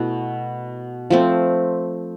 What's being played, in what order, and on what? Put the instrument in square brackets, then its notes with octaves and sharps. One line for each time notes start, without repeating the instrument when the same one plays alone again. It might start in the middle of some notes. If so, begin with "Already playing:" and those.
Already playing: [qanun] B2 A3 E4
F3 A3 C4